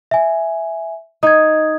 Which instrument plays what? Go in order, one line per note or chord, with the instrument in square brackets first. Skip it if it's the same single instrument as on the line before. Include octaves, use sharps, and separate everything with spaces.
[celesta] E5 G#5
[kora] D#4 [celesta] D#6 G#6